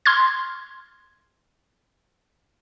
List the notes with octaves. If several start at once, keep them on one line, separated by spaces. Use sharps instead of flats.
C6 F6 G#6